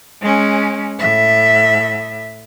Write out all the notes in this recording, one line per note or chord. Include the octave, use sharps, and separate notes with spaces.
G#3 C#4
A2 E5